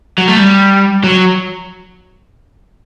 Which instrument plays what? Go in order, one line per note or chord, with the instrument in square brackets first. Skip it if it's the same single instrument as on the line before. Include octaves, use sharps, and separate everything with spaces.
[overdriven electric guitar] F#3
A3
G3
F#3